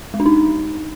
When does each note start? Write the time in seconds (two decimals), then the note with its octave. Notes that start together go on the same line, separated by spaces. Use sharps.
0.14 G#3
0.20 D4
0.26 D#4